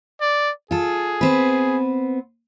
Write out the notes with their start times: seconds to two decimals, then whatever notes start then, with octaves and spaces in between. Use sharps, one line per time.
0.21 D5
0.71 F4 G#4 A4
1.21 B3 C4 B4